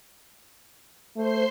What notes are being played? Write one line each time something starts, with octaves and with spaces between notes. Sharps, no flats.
A3 C5 C6